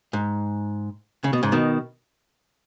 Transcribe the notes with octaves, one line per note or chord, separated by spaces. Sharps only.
G#2
C#3
B2
G#2 C#3
B2 D#3